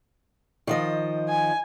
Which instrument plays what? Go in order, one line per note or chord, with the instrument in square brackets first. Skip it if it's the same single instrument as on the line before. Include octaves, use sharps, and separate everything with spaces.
[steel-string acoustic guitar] D#3 F3 D#5
[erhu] G#5